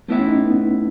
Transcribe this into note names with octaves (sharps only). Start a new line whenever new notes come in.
A3 B3 E4 B4 E5
C#4
D#4
B3